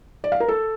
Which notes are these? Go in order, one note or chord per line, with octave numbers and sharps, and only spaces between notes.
D5
F5
A#4
A4